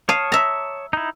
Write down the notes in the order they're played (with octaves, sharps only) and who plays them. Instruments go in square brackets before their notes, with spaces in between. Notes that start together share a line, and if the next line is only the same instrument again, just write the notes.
[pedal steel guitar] C#5 A5 D#6 [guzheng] F5
[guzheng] E5 A#5
[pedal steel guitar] D#4 E4